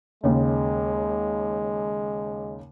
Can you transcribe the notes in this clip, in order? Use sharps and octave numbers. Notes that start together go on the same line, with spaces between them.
D#2 C#3 G#3